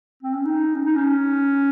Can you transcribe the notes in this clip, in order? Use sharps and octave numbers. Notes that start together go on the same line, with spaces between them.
C4
C#4
D#4
C#4
D#4
C#4